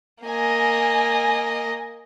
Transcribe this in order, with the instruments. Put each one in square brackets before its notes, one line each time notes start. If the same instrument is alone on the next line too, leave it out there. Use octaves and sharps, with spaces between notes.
[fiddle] A#3 D#5 [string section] G#5